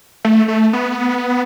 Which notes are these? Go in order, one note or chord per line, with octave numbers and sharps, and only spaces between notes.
A3
A3
B3